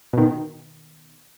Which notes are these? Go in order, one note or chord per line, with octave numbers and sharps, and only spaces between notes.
B2 D#3